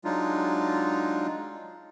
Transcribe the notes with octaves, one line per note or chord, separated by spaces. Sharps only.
F#3 G#3 D4 D#4 F4